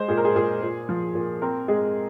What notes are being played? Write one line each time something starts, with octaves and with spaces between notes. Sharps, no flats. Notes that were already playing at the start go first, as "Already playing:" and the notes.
Already playing: G#3 C5
A#2 G#4
A#4
G#4
A#2 G#4
A#2
F3
A#2
C4 A#4
G#3 G#4